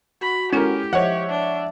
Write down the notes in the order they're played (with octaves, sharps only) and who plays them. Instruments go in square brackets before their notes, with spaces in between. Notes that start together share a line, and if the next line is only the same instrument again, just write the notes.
[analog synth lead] F#4 [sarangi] B5
[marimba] G#3 E4 A4 [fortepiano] C#4 A#4 [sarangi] G4
[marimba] F3 C5 D#5 [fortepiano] C#5 F#5 [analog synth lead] E5
[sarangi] D4